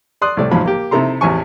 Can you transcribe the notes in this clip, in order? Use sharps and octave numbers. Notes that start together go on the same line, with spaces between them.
D5 C6 D#6 F#6
C2 A2 A3 D5
A1 E2 G#2 F3 F#3 B5
A#3 G4
C3 D#4 E4 A4 A#5 C6
A1 E2 A2 C4 G#5 C#6